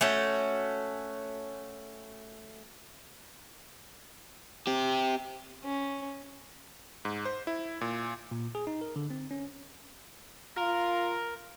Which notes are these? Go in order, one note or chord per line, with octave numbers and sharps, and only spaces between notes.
A3 C#4 F#4
C4 G4
C#4
G#2
C5
E4
A#2
A#2
G#4
D#4
A#4
D3
C4
C#4
F4 A#4